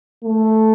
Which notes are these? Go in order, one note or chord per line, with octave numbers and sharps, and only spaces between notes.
A3